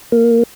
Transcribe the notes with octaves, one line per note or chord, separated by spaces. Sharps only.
A#3